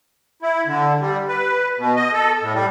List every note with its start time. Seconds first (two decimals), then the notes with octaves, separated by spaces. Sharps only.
0.42 E4
0.66 D3
1.00 G3
1.28 B4
1.78 B2
1.96 D#5
2.13 A4
2.42 A2
2.54 G3